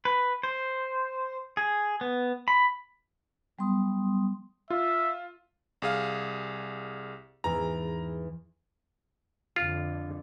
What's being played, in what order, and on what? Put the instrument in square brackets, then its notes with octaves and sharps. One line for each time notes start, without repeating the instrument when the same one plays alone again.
[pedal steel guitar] B4
C5
G#4
B3
B5
[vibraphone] F#3 G3 B3 C6 D#6
[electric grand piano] F4 [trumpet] E5
[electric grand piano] C2 G#4 F5
[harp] E2 G#2 E3 [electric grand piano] A#5
[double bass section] F2 D3 [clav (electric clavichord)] F4